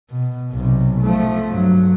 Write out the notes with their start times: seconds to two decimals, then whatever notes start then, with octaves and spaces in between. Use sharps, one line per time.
0.10 B2
0.52 B1 C3
1.02 F3 A3
1.50 G2 F#3